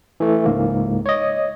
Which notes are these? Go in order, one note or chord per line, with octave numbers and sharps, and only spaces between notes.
E3 A3
C#2 G#2 A#3
C#5 D#5